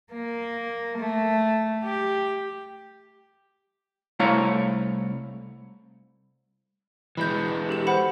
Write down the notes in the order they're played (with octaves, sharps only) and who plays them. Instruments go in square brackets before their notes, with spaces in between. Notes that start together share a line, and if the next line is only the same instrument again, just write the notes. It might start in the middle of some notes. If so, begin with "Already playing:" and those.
[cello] A#3
A3
G4
[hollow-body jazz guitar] C2 A3 E4 C#5 F5 A#5
[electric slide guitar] E3 G3 G#3 [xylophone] B5 G6
[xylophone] G4 A4 E7
C5 F#5 B5